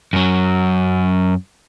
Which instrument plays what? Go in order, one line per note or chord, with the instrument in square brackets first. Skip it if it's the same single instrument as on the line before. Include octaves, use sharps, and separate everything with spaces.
[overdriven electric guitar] F#2 F#3